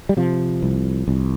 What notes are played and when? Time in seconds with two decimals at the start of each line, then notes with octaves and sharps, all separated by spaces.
0.09 G3
0.17 C3 F3
0.63 C2
1.08 C2